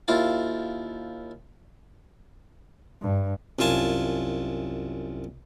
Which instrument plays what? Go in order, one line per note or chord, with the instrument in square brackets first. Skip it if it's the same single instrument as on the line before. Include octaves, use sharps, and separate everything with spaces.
[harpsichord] D#2 E4 F4 A5
[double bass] G2
[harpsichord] C2 F#2 F4 G#5 A5